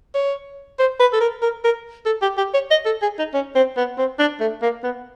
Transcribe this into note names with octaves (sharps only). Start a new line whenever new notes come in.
C#5
C5
B4
A4
A#4
A#4
A#4
A4
G4
G4
C#5
D#5
A4
G#4
D#4
C#4
C4
B3
C4
D4
A3
A#3
B3